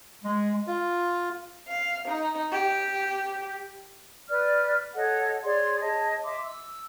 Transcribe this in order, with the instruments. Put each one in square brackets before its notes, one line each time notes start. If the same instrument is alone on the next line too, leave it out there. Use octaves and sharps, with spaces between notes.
[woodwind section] G#3
[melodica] F4
[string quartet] F5
D#4
G4
[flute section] B4 D5 F6
A4 C#5 D#5 F#5
G#4 C#5 D5 C6
G#4 C#5 D#5 A5
D#5 E5 C6 D6
E6